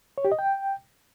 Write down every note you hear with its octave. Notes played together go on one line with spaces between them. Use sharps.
C#5
G4
D#5
G5